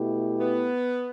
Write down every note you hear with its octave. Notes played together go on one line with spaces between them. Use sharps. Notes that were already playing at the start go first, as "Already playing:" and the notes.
Already playing: B2 A3 E4 G4
B3